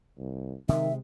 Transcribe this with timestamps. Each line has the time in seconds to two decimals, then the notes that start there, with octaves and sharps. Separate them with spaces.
0.18 C2
0.69 C3 D#3 G#3 E5